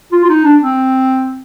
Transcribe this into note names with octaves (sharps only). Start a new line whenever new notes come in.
F4
F4
D#4
D4
C4